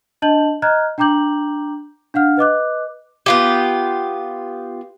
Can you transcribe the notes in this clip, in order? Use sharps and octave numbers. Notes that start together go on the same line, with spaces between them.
D4 D#5 A5 G6 F#7
D#5 A#5 F6 F#6 G#6
D4 G5 A#5 D6 G6 F#7
D4 F5 F#5 F6
B4 D#5 D6 F#6
B3 F4 G4